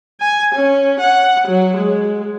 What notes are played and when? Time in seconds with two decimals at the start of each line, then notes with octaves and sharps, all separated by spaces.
0.21 G#5
0.55 C#4
1.00 F#5
1.48 F#3
1.77 G#3